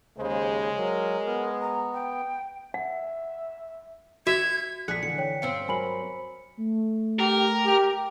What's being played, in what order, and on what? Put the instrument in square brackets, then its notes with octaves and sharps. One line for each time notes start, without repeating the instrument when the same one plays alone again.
[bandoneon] D#2 C#3 [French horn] G#3 [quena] C5
[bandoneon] F#3 [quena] A#4
[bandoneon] B3
[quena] A#5
G5
[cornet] E5 [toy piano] F#5
[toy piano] F#4 [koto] E5 [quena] G#6
[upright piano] A#1 [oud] G#4 [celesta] F#6 [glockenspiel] B6 C#7
[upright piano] D3 E3 [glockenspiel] C#7
[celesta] C#5 G5
[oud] G2 C4 C5 [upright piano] F5 [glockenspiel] C#7
[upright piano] F#3 A#4 [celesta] G#5 B5 F#7
[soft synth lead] A3
[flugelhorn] G4 [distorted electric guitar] A#4
[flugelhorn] G4